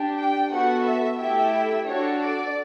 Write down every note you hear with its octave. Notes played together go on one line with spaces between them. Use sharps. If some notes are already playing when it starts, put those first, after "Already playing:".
Already playing: D4 G4
G5
B3 F#4 A4 F#5
E5
A3 E4 G4 E5
D4 F#4 A4 C#5
D5